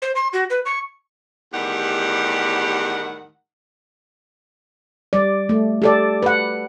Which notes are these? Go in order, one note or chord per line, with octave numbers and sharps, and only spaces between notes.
C5
C6
F#4
B4
C#6
E2 A2 D#3 G3 G4 F#5
G3 D5
A3
G4 A4 D5
B4 F#5